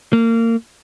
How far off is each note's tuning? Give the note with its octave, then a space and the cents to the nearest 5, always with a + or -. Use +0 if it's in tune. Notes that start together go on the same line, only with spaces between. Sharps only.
A#3 -30